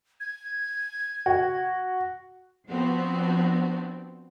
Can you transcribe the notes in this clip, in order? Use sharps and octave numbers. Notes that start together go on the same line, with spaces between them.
G#6
F#4
F3 B3 C4 D4 F#4